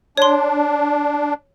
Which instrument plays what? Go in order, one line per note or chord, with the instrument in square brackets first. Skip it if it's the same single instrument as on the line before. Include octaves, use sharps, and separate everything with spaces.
[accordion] D4 [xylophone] C#5 C6